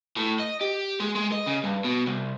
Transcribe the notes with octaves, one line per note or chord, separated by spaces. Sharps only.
A2
D#5
G4
G#3
G#3
D#5
C#3
G2
B2
C2